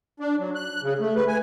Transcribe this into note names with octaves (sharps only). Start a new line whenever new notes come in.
D4
F#3
F#6
C#3
A3
B4
G#5